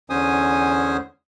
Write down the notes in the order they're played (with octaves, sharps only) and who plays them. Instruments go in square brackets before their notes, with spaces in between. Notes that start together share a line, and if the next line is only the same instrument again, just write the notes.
[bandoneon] E2 D3 C#4 C5 G#5 D#6